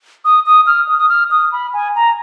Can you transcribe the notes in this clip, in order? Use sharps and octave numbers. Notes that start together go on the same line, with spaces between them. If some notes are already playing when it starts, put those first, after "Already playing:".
D#6
D#6
F6
D#6
D#6
F6
D#6
B5
G#5
A#5